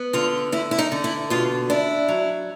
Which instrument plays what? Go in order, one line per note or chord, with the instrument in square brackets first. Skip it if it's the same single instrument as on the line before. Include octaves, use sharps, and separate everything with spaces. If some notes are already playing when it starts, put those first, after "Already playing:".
Already playing: [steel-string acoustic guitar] B3
D3 F4
D3 E4
E4
D#4
D3
E4
B2 F4
D4 E4
F#3